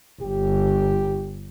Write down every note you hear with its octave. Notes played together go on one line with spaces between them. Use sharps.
G1 G4